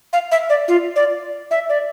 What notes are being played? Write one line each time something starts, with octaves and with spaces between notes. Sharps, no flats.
F5
E5
D5
F4
D5
E5
D5